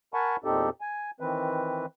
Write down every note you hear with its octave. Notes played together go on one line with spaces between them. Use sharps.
A#4 F#5 G#5 A5 B5 C#6
E2 A#2 C4 D#4 G4 A4
G#5
D#3 E3 C4 B4